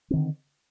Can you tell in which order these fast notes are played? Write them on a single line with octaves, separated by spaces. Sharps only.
C4 D#3 D3